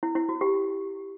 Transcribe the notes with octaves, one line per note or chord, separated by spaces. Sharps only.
E4
E4
F#4
G4